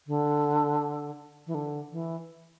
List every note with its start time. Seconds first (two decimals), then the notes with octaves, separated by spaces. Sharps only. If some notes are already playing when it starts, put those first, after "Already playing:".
0.07 D3
1.47 E3
1.54 D3
1.91 E3